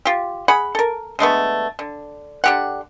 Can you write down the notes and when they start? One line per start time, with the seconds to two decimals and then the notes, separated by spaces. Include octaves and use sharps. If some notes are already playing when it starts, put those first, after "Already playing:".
0.05 F4 G4
0.48 G#4 F#5 B5
0.75 A4 A#4
1.19 D3 G#3 A3 B3
1.79 D3
2.44 D3 G4 F#5